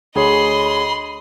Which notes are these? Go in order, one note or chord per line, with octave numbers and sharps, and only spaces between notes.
D2 G#4 C#5 D#5 B5 C6